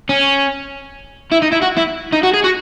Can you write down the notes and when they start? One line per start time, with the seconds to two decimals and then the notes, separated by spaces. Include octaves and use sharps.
0.09 C#4
1.32 E4
1.42 D#4
1.53 E4
1.63 F#4
1.77 E4
2.13 D#4
2.24 F#4
2.34 G#4
2.44 F#4